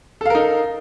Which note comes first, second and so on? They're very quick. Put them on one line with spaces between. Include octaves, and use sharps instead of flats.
A4 F5 A#4 D#4